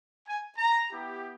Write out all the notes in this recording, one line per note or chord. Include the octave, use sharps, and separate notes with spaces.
G#5
A#5
B3 E4 G4